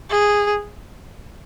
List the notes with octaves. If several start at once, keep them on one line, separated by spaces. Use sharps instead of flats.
G#4